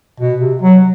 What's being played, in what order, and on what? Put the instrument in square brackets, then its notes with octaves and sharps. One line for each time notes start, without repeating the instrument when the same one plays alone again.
[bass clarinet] B2
C3
F#3